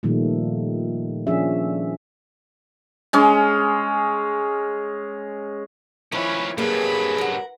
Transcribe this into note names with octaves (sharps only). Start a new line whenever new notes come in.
A#2 D#3 F3 G3 A3
F3 C#4 D4 G#4 E5
G#3 C#4
D#3 F3 C#4 E4 B4 C#5
G2 C3 F#3 A#3 G#4 B4 B5
A#4 F#5